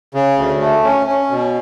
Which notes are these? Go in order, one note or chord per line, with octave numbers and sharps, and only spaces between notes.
C#3
D2
A3
C#4
C#4
B2